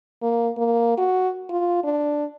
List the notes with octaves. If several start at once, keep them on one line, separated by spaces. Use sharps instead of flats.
A#3
A#3
F#4
F4
D4